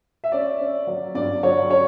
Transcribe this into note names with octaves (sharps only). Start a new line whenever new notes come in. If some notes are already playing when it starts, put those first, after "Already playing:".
E5
C#4 D5
C#4
F#3
G2 D5
F#3 C#5
C#4 C#5